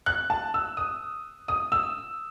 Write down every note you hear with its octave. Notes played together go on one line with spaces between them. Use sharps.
F#6
A5
E6
D#6
D#6
E6